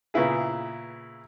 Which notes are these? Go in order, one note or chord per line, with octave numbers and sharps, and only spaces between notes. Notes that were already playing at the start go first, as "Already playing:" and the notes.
A#2 C#3 B3 E4 G#4